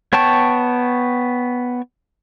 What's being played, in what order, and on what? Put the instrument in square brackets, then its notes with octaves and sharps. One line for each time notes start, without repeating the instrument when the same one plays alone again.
[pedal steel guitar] B3 C#5 G5 A5 C#6